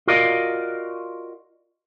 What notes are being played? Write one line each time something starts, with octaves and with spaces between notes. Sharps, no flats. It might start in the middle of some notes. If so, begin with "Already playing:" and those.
F4 F#4 A#4 D5 D#5 F5